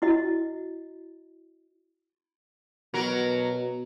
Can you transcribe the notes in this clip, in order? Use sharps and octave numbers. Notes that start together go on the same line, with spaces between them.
E4 F#4 D#5
B2 F#3 A#4